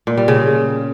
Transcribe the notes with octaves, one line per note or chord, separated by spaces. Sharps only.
A#2
G3
C#3